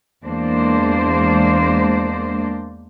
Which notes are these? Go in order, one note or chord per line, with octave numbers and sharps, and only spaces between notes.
E2 G#3 A#3 D4 C5